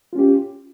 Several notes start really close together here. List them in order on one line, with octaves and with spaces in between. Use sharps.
F4 C#4 G4